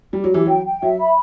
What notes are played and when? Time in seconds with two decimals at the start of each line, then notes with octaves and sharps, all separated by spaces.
0.13 G3 G4
0.24 F#3
0.30 E3 G4
0.46 F#3 G5
0.65 G5
0.82 F#3 E5
0.99 B5